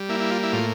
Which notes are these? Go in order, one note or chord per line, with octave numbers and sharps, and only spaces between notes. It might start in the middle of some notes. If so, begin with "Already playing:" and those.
Already playing: G3
A#3 E4
E4
F4
E4
A2 F4